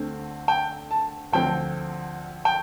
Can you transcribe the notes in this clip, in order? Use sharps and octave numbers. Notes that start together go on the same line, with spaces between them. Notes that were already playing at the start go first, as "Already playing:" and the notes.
Already playing: D2 D3 A3 C4
G5
A5
D2 D3 F3 C4 G5
G5